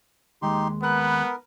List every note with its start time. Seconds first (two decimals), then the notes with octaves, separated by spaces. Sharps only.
0.42 D#2 G#3 D#4 G4 C6
0.82 B3 A#4 B4 F#6